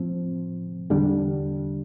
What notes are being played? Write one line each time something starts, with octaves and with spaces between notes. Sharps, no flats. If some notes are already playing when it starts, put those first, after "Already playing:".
Already playing: A2 F3 C4
E2 D3 G3 D4